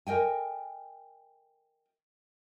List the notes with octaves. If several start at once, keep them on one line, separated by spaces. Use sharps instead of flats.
A#4 D#5 G5 G#5